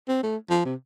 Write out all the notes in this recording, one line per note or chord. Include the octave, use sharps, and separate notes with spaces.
C4
A3
F3
C3